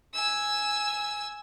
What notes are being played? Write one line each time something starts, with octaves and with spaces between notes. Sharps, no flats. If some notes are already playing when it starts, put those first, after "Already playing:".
G#5 E6